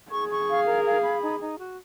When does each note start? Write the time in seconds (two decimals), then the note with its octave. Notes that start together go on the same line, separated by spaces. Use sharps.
0.12 G#4 C#6
0.30 C#6
0.48 F5
0.66 A#4
0.85 F5
1.03 B5
1.21 D#4
1.40 D#4
1.58 F#4